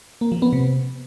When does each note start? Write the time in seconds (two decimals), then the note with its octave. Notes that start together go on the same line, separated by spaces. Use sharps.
0.21 A#3
0.32 F3
0.42 B3
0.53 C3